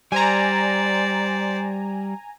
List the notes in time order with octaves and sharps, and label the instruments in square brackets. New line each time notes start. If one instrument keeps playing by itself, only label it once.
[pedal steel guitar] G3 [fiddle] C5 D5 [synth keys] G#5 A#5